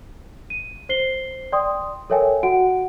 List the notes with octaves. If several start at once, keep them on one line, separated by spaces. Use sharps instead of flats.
D#7
C5 C7 G7
D5 G5 C6 D#6
A4 A#4 C#5 E5 G5 G#5
F#4 F#5 D7